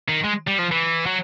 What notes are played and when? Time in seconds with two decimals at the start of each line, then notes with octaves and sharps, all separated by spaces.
0.08 D#3
0.24 G#3
0.47 G3
0.58 F3
0.71 E3
1.06 F#3